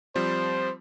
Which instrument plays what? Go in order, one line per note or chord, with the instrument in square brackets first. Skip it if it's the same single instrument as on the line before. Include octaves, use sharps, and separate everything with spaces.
[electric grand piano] F3 G3 C4 [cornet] C5